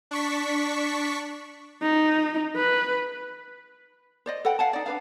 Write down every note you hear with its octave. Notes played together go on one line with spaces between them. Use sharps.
D4 C#6 B6
D#4
B4
C5 D5 D#5
A4 B4 F#5 G5
F5 F#5 G#5 A5
D#4 D5
D4 B4 F5